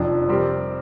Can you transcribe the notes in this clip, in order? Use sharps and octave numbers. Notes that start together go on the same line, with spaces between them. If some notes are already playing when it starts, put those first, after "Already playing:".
Already playing: F1 F2 F3 D4
C3 G3 C4 G4 A#4